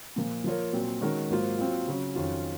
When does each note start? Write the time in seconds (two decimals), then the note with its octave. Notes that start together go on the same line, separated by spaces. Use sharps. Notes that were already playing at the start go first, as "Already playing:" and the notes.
0.16 A#2 F3 A#3
0.44 F3 A#3 F4 A#4 C#5
0.73 A#2 F#3 C4
1.01 D#3 G#3 C#4 F#4 A#4
1.30 G#2 F#3 A#3 F4 C5
1.59 F#3 C4 F4
1.88 C#3 F#3 C#4
2.16 F2 D#3 F#3 C#4 F4